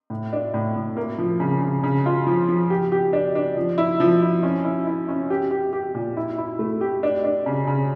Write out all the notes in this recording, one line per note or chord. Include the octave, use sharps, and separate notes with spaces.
A2
D4
A2
A2
A#3
F3
C#3
C#3
C#3
F4
F3
F3
G4
G4
D4
D4
F3
E4
F3
E4
C#4
E4
E4
C#4
G4
G4
G4
A#2
E4
E4
A3
G4
D4
D4
C#3
C#3